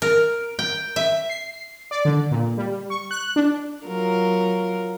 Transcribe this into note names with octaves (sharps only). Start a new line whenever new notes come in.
A#4
G5
E5
C7
D5
D3
A#2
G3
C#6
F#6
D4
F#3 F4 A#4